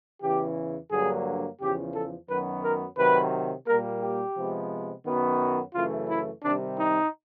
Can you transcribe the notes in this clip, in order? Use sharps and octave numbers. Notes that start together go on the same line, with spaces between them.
E2 C#3 E3 G4
G2 D3 F#3 A#3 G#4
E2 C#3 F3 G4
A4
F#2 D#3 F#3 B3 B4
A#4
C3 D#3 F#3 B4
A#2 G3 A#3 A#4
G4
C3 F3 G#3 B3
F#2 D#3 F#3 B3
F#2 C#3 E3 A3 F4
E4
C3 D#3 G3 D4
D#4